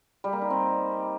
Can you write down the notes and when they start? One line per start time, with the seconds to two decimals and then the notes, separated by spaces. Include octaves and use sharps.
0.24 G3
0.33 A#3
0.42 D#4
0.50 C4